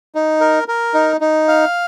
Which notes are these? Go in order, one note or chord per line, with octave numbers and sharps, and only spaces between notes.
D#4
A#4
A#4
D#4
D#4
F5